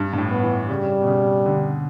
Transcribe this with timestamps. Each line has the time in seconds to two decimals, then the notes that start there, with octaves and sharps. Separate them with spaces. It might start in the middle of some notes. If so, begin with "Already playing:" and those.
Already playing: G2
0.13 G2
0.18 A2
0.31 B3
0.43 E3
0.68 C#3 G3
1.01 B2
1.07 C#3
1.46 D3